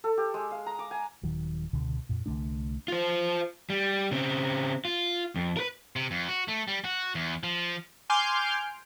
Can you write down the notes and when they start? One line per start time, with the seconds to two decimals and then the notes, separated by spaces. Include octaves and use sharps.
0.04 A4
0.17 G4
0.34 G#3
0.51 F5
0.66 A#5
0.79 D6
0.91 G#5
1.23 D#1 D#3 F#3
1.73 C#2 B2 D3
2.09 F2 A#2
2.26 C2 D3 A3 D4
2.88 F4 C5
3.70 G3
4.11 C#3 C4
4.85 F4
5.36 F2
5.57 A#4 B4
5.96 C3
6.11 F2
6.29 F#4
6.48 A3
6.68 G3
6.84 F#4
7.15 E2
7.43 F3
8.10 G#5 C6 D6 F6 G6